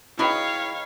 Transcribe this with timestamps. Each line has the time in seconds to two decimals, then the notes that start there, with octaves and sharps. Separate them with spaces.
0.19 D#4 E4 F#4 G#4 B4 C#5 F5 G5